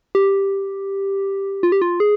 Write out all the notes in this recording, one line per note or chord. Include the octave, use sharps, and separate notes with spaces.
G4
F4
G4
F4
G#4